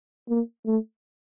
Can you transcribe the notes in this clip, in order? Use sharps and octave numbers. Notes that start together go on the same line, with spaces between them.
A#3
A3